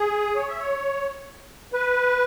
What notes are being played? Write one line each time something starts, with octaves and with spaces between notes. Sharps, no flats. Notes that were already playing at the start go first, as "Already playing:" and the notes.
Already playing: G#4
C#5
E5
C#5
B4